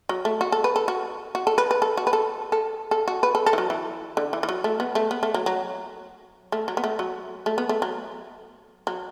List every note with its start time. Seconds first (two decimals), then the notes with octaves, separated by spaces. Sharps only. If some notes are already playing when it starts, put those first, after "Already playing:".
0.09 F#3
0.25 A3
0.41 F#4
0.52 A4
0.64 B4
0.76 A4
0.88 F#4
1.35 F#4
1.47 A4
1.58 B4
1.71 B4
1.82 A4
1.97 F#4
2.07 B4
2.13 A4
2.52 A4
2.91 A4
3.08 F#4
3.23 B4
3.35 A4
3.46 A4
3.53 E3
3.58 F#3
3.70 E3
4.17 D3
4.33 E3
4.43 E3
4.49 F#3
4.64 A3
4.80 B3
4.95 A3
5.11 B3
5.23 A3
5.34 F#3
5.46 F#3
6.52 A3
6.68 F#3
6.77 B3
6.84 A3
6.99 F#3
7.46 A3
7.58 B3
7.69 A3
7.82 F#3
8.87 F#3